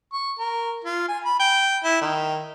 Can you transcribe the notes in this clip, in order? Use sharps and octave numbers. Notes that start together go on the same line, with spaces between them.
C#6
A#4
F4
G#5
B5
G5
E4
D#3